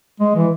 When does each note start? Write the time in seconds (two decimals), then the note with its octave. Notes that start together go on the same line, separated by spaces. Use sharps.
0.20 G#3
0.35 E3